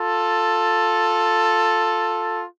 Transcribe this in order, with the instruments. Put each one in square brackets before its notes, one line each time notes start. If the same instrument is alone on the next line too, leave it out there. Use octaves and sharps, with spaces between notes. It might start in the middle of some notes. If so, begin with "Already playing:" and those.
Already playing: [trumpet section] F4 A4